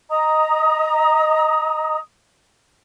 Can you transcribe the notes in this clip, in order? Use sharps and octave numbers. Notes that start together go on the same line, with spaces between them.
D#5 A#5 D#6